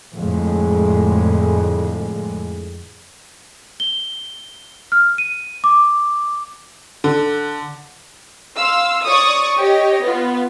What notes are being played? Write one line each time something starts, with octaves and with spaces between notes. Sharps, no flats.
F2 A2 D3 G#3
G7
F6
D#7
D6
D3
F5 C6 E6
C#5 D5 C#6 D#6
G4 C#5 D#5
B3 F4